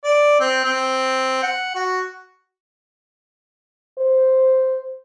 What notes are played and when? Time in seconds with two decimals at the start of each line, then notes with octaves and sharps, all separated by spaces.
0.04 D5
0.40 C4
0.65 C4
1.43 F#5
1.75 F#4
3.98 C5